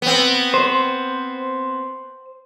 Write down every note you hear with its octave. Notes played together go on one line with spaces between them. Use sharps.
B3 C4
C5